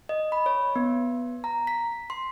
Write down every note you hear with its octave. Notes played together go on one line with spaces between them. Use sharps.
D#5
B5
C#5
B3
A#5
B6
C6